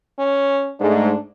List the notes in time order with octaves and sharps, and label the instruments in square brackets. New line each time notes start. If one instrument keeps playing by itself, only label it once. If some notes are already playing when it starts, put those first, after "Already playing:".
[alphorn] C#4
[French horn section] G#2 A3 [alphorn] D4